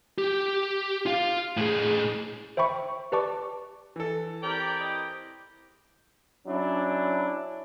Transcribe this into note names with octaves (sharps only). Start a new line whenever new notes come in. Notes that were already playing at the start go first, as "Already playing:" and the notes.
G4
F4 F5
A2 G#4
C5 E5 G5 B5 C#6
G4 B4 D5 A5 C#6 D6
E3 A4
C4 E4 G4 A#4 D5 G5
D#5
F#3 C#4 D4 E4